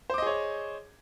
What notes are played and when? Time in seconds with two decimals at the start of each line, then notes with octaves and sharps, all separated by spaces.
0.10 C5
0.14 D6
0.18 D#5
0.22 G#4
0.27 C#5